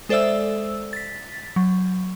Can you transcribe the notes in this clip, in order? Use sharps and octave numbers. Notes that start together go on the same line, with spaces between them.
G#3 A4 C5 D5 E5 E6
A6 B6
F#3